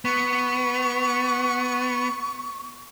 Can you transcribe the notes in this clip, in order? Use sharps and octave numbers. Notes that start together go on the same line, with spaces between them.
B3 C#6